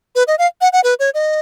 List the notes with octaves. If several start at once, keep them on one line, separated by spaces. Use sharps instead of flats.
B4
D#5
F5
F#5
F#5
B4
C#5
D#5